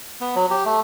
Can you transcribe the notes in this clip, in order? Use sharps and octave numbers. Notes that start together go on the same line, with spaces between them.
B3
F#3
G4
A3